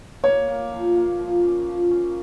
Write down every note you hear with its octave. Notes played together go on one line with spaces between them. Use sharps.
A#3 C#5
A#3
F3
A#3
F3
C#4
F3
C#4